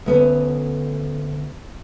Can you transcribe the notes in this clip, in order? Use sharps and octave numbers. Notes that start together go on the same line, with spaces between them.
D2 B3 C#4